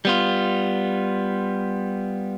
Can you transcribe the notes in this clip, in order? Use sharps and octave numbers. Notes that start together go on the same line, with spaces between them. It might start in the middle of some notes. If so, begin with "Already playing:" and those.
G3 B3 F4